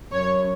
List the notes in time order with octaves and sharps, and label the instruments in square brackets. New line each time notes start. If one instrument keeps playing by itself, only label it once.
[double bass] F#2 [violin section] C#5